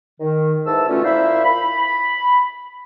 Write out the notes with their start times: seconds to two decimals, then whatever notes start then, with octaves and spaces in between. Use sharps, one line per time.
0.20 D#3
0.66 G#2 E3 A5 E6
0.88 B2 D3 A3 C#4 F4
1.04 A#2 A#3 E4 C5 E5
1.44 B5